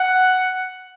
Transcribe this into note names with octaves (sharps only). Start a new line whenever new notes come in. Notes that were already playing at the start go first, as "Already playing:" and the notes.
Already playing: F#5